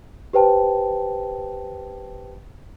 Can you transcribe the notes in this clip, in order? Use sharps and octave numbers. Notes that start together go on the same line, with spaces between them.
G4 B4 C5 G5 A5